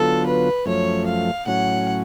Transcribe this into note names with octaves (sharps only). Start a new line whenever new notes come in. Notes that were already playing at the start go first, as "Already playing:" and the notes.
Already playing: D3 F#3 B3 F4 A4
B4
F#2 F3 A3 C#5
F5
A2 F#3 C#4 F#5